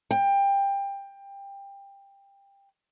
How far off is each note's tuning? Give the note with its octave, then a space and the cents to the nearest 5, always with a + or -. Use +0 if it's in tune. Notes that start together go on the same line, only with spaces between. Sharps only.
G5 +20